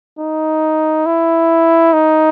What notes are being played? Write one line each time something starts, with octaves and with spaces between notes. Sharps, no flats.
D#4
E4
D#4